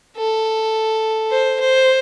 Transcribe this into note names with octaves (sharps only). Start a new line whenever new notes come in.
A4
C5
C5